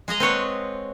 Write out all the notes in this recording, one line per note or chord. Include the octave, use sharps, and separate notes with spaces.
G#3 G#4 D#5 A#5
C4 B4 C#5 F#5